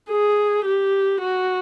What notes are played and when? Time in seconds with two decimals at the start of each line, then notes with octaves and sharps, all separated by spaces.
0.10 G#4
0.65 G4
1.21 F#4